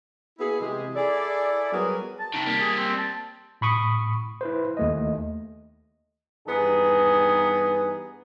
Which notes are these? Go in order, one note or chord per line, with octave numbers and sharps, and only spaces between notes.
A#3 B3 E4 F#4 G#4
C3 E3 G#3 G4 G#4
E4 G#4 A4 D5
F#3 G3 B3 G#4 A#4 B4
A5
C3 D#3
G3 A#3
G#4
C4
A5
A2 B5 C#6 D#6
E4 B4 C5
D#2 A3 D#5
G2 E3 B3 D#4 G#4